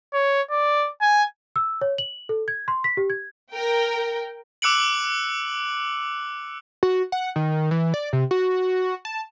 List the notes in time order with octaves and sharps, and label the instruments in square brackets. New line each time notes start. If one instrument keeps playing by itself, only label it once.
[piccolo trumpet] C#5
D5
G#5
[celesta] E6
C#5
F#7
A4
G#6
C6
B6
G4
G#6
[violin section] A#4 G5
[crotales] D6 E6 F#6 C#7 D7 F#7
[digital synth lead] F#4
F#5
D#3
E3
D5
C3
F#4
A5